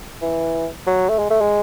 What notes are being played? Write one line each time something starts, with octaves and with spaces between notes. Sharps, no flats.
E3
F#3
A3
G#3
A3
G#3